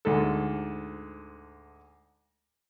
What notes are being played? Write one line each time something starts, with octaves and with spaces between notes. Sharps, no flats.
D2 G#2 A4